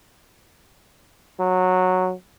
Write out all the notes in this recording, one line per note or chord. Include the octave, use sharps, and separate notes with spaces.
F#3